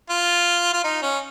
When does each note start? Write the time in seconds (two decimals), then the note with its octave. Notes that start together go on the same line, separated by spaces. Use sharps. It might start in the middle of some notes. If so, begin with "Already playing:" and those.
0.09 F4
0.73 F4
0.84 D#4
1.02 C#4